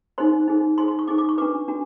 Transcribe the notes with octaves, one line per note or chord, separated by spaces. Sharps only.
D#4 G#4 C5 C6
D#4 G#4 C5
D#4 G#4 C5 C6
C6
C#6
D#4 G#4 C5 D6
D6
C#6
D4 F#4 B4 D6
D4 F#4